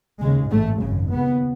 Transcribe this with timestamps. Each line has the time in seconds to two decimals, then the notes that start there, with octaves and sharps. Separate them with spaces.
0.20 D#2 C#3 G#3
0.50 A1 G#2 A3
0.80 G#1 F#2 C#3
1.10 D#2 C#3 B3